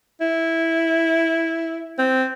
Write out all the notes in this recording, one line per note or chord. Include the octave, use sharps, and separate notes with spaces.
E4
C4